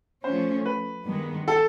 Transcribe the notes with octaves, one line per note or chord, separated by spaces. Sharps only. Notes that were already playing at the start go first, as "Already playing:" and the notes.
F3 A3 C#4 C5
B4
G2 D#3 G#3 B3
A4